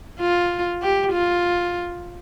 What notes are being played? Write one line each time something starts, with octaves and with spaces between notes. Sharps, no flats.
F4
G4
F4